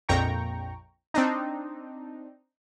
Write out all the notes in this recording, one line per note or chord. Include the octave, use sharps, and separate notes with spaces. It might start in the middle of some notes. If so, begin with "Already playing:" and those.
A#1 F2 G5 A#5 C#6
C4 D4 D#4